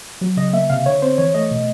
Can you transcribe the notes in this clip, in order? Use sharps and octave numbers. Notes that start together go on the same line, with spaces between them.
F#3
C#3 D#5
A#3 E5
C3 F5
D3 C#5
C4 C5
E3 C#5
A3 D#5
B2